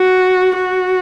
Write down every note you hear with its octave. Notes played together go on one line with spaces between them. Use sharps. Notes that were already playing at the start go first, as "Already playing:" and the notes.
Already playing: F#4
F#4